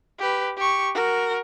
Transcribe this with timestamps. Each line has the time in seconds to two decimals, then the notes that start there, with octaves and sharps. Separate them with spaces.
0.19 G4 B4
0.57 G4 C#6
0.94 F#4 A#4